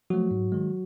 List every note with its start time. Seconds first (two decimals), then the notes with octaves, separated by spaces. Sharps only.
0.10 F3 F#3 A3 F#4
0.31 G#2
0.52 D#3 G#3